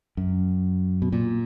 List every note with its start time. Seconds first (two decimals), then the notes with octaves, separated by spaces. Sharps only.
0.17 F#2
1.02 B2
1.12 A#2